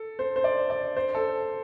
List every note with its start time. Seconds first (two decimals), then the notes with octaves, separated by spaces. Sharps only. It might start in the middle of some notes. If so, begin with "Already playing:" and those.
Already playing: A4
0.19 C5
0.36 C5
0.44 D5
0.70 D5
0.97 C5
1.15 A4